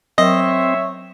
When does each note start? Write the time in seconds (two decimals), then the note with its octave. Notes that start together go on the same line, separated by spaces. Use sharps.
0.18 F#3 C4 A#4 C#5 D#5 E5 G5 C#6